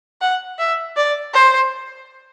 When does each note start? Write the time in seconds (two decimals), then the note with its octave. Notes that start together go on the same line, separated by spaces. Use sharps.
0.21 F#5
0.59 E5
0.96 D5
1.34 C5